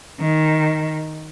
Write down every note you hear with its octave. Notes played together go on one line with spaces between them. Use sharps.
D#3